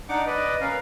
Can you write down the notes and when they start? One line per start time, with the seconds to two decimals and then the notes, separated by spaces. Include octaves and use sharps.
0.09 D4 D#4 F#5 D6
0.26 B4 D5 D#5
0.61 C#4 A#4 B4 F5